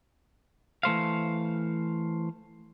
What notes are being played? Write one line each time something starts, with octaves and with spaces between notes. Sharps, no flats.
E3 A3 C5 F5